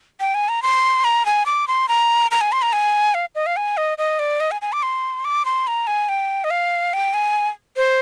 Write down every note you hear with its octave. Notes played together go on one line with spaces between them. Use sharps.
G5
G#5
A#5
C6
A#5
G#5
D6
C6
A#5
A#5
G#5
C6
A#5
G#5
F5
D#5
F5
G#5
D#5
D#5
D5
D#5
G#5
G#5
D6
C6
D6
C6
A#5
G#5
G5
D#5
F5
G5
G#5
C5